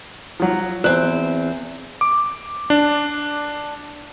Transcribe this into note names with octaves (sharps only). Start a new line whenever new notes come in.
F3 F#3
E2 C4 F#6
D6
D4